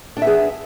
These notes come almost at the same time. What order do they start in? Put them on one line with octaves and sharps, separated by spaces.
D4 D5 E5 B3 G#4